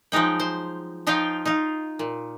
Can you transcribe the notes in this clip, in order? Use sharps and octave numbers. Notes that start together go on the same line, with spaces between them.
F3 F#3 G#3 D#4 G5
C5
F3 D#4 F4 C#5 F5 G5
D#4 F4
A#2